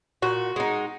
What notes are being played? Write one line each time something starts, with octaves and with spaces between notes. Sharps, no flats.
A#2 F#4
G#3 D#4